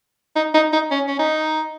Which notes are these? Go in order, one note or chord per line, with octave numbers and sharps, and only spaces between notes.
D#4
D#4
D#4
C#4
C#4
D#4